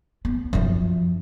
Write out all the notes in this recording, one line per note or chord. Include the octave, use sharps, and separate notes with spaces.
B3
F#2 F3